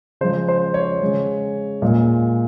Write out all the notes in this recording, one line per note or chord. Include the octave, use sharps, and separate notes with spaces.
C#3 F3 G#3 C5
C5
C#5
C#3 G#3
A#2 G#3